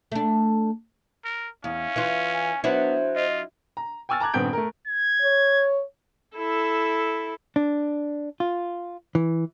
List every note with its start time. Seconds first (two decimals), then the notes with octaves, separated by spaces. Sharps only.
0.12 A3 D4
1.25 A#4
1.64 E2 C#4 F5
1.96 E3 F4
2.33 G#5
2.64 F#3 B3 D4 E4 C5
3.16 F4 D#5
3.77 A#5
4.09 G5 G#5 C#6 E6 F6 A6
4.20 A5 A#5 D6 F#6 G#6
4.34 D#1 G2 B3 C4 G6 D7
4.53 A3 A#4
4.88 G#6
5.22 C#5
6.36 E4 A4
7.56 D4
8.40 F4
9.15 E3